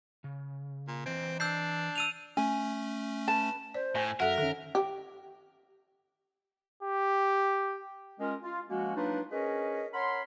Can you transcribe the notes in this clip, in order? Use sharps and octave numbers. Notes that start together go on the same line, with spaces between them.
C#3
A#2
E3 C4 D#5 G#5
D4 E6 G6 C7
E6 D#7 F7
A3 C#4 G#5
B4 A5
C5 D5
A2 G#5 A#6
F#2 A4 A#4 E5 F#5
D#3 C#4 A4
G4
G4
G#3 C#4 F4 A#4
F4
F3 G#3 A#3 C#4 F#4
F#3 A#3 D4 D#4 F4 B4
C#4 G#4 A#4 B4 C#5 D#5
A#4 C#5 F#5 B5 C6